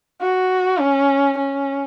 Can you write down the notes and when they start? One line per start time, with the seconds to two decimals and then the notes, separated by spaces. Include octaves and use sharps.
0.21 F#4
0.80 C#4
1.37 C#4